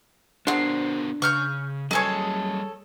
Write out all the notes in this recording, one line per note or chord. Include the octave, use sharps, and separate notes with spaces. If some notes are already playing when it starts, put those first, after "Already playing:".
B3 C4 D4 F#4 G#4 A#4 F#5 C6
C#3 C#6 F6 G6
F#2 G3 G#4 A4 C#5 D#5 G#5